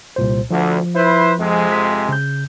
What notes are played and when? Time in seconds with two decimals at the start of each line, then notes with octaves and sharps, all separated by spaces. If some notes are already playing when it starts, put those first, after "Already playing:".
0.16 C2 A#2 C5
0.51 D2 F3
0.94 E4 B4 C5
1.38 F2 C3 G#3
1.72 B6
2.09 C#3 G6